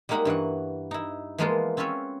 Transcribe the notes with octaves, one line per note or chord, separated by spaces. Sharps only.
G3 G#3 A#3 D#4 F#5 B5
G2 E3 F#4 F#5
D#4 E4
E3 F3 G#3 A#3 B3 F4
C4 C#4 F4 B4 C#5 E5